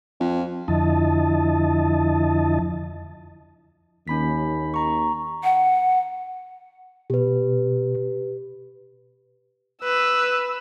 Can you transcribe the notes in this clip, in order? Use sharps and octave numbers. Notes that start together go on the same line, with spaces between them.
F2
F2 D3 F3 E4 D#5 A5
D#2 C#4 B5 B6
A#5 C#6
F#5
B2 G4 B4
B4 E6